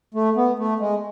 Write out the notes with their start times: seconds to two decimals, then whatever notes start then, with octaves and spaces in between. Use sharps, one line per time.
0.14 A3
0.36 B3
0.58 A3
0.79 G#3